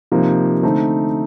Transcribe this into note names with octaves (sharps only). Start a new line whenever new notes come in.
C3 F3 A#3 D#4
D3 A3 C4 D#4